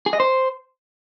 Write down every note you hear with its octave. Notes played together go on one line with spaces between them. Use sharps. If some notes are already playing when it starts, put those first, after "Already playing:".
G#4
D#5
C5